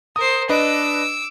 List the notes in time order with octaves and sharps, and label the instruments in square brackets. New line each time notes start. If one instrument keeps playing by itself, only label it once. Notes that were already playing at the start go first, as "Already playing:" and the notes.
[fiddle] A#4 C5 [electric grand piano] D#6
[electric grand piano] D4 B4 D#5 [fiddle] D6 E6